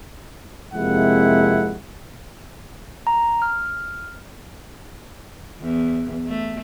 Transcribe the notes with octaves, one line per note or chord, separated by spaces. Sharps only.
F2 C3 G#3 A#3 E4 F#5
A#5
F6
E2
A3